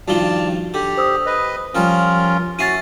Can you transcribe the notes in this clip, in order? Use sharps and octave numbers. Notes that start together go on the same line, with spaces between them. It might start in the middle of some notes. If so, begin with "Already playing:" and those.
G2 D#3 F3 F#4 D5 A5 G7
D3 G4
C5 D#6 E6
B4 D#5
F3 G3 C#4 F4 A#4
C#4 E4 F#4 A6 C7 D#7